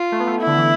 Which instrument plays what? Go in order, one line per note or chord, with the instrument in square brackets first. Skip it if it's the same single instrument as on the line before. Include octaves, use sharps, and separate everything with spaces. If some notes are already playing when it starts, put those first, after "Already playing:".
Already playing: [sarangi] F4
[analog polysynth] A3
B3
A3
[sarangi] E4
[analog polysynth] D3
E3